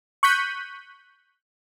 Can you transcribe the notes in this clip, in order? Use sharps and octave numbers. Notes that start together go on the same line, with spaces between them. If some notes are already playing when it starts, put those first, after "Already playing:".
C#6 F#6 G6 B6 D#7